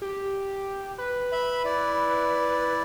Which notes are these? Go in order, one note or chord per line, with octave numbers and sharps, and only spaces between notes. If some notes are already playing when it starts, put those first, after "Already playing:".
G4
B4
E5 B5
E4 D5